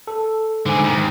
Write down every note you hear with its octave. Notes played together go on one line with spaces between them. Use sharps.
A4
G#2 D3 G#4
D#2